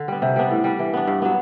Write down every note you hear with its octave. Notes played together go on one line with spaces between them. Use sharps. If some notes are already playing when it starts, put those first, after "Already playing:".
Already playing: D3
G3 B3
C3
G3 B3 D4
A2
G3 D4
E3
B3 D4
G2
F#3 B3